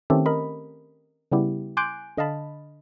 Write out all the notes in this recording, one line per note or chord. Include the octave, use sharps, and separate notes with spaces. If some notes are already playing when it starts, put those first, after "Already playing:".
D#3 A3 C4 C#4 G4 A4
A#4 D#5 B5
C#3 G3 B3 E4 G4
G#5 C6 D6 F#6 G6 D7
D3 D#5 F5 A5 B5